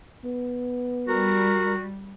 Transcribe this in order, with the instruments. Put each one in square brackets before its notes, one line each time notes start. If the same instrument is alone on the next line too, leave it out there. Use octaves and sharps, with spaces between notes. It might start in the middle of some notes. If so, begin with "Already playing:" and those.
[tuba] B3
[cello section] G3 [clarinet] F#4 [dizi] A#4